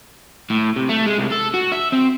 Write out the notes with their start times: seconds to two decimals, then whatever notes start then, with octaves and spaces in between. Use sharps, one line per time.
0.50 A2
0.76 C3
0.89 A3
1.06 G#3
1.18 C2
1.32 A4
1.54 F#4
1.72 E5
1.93 C4